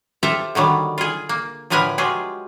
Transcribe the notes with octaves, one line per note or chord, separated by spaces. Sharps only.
F4 G4 A4 C5 E5 A#5
D3 D#3 F#3 G3
F4 G#4
A#3
A2 D3 F3 A#4 B4 G#5
F#3 G#3 F4 G4 G#4